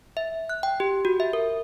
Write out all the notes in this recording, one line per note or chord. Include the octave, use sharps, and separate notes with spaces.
E5
F#6
G5
G4
F#4
E5
A#4